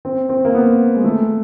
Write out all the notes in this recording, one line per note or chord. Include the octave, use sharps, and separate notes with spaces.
C4
C4
A#3
B3
G#3
A3